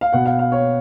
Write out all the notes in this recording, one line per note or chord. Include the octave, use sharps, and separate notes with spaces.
F5
B2 F#5
F5
F5
C#5